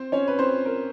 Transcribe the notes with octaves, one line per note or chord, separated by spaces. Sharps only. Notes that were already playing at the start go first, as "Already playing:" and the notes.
Already playing: C4 C5
C#4 C#5
B4
C4 C5
A#4